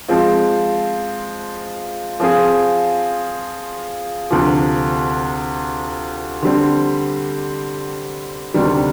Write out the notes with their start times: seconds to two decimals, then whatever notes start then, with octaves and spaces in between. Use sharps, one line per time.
0.08 F3 G#3 C4 F4
2.20 F3 C4 F4 G#4
4.31 D2 C3 F3
6.43 D3 G3 C4
8.54 D2 C3 D#3 G3